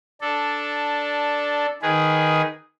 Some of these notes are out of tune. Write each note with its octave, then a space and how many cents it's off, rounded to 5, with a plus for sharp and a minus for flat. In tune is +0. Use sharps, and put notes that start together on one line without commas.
D4 -5 A4 +0
D#3 +5 G#4 +0 B4 +0